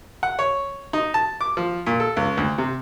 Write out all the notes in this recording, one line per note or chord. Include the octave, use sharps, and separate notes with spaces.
F#5
C#5
D#4
A5
D6
F3
A#2
A4
C#2
D2
C3